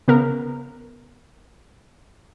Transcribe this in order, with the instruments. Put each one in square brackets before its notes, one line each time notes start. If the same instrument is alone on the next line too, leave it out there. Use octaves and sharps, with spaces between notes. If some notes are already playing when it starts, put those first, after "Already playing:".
[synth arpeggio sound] C#3 B3 A#4